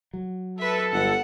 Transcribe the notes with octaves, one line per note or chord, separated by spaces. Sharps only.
F#3
A4 B4 E5
G1 F#5